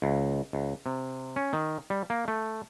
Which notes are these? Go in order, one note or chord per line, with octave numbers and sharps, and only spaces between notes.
C#2
C#2
C3
C#4
D#3
G3
A#3
A3